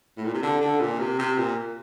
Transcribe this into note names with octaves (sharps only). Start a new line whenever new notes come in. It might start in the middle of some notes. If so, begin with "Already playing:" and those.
A2
A#2
C3
D3
D3
A#2
C3
C3
A#2